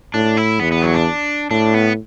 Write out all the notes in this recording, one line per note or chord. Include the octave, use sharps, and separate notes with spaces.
A2 D4
E4
E2 B3
B3
F#3
D4
A2 D4
B3